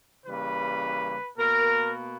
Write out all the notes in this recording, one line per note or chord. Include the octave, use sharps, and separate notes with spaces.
C#3 E3 G3 A#3 B4
B2 A#3 A#4